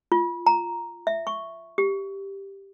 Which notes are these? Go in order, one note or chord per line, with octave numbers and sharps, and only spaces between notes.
F4
A#5
E5
C#6
G4